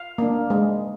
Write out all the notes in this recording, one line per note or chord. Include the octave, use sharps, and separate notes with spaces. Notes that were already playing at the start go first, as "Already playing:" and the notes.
Already playing: F5
A#3 D4
G#3